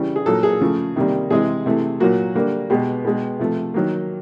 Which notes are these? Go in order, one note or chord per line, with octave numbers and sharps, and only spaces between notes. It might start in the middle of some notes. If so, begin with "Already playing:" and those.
Already playing: C#3 E3 G3
G#4
A#2 F#3 A#3 A4
G#4
C#3 F3 A3
C3 D#3 G3 A#3
C3 E3 G#3 G#4
C3 E3 A3
A#2 F#3 A#3 F#4
D3 G3 A#3
B2 G#3 G4
B2 G#3
C3 F3 A3
D#3 F#3 A#3